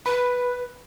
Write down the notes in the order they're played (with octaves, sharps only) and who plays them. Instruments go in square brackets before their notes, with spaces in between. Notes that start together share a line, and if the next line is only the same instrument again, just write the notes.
[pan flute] B4 [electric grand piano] B5